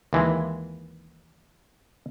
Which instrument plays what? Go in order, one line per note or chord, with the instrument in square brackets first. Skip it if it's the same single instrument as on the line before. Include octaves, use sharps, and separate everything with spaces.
[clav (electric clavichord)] D#2 E3 G#3